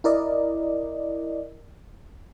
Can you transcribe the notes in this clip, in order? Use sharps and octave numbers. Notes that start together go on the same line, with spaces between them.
E4 A#4 D5 D#5